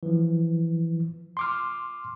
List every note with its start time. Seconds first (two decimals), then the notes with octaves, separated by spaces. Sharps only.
0.03 E3 F3
1.37 C6 D6 F6